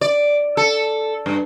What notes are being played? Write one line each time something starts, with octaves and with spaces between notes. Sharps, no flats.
D5
A4
G2